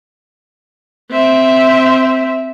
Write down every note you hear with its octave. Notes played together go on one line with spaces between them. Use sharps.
C4 E5